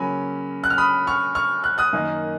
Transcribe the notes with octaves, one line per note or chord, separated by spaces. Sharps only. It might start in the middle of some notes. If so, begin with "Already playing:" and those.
Already playing: C#3 F#3 A#3 C#4 G#5 B5
F#6
F6
B5 D#6
C#6 F6
C#6 F6
F#6
D#6 F#6
F#2 D#3 A#3 D#4